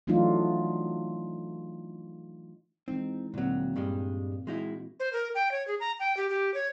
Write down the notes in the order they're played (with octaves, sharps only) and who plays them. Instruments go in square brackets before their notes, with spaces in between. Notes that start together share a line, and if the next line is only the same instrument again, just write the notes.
[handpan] E3 F#3 A3 D4 D#4 F4
[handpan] E3 G#3 D#4 [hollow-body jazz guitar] C4
[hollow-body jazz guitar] D2 F#3 [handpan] A#2 A#3 C4
[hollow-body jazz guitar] G2 G3 G#3
[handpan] E3 F#4 [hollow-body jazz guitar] G#3 D#4 E4
[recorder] C5
A#4
G5
C#5
G#4
A#5
G5
G4
G4
C#5